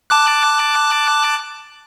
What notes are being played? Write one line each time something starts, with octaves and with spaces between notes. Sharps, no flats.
A5 D6 F#6